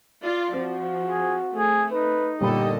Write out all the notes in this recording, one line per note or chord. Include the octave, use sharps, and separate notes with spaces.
F4 D5
F3 C4 F#4
G#4
A3 G#4
D#4 B4
G1 A#2 D3 G4 A4 D#5 B5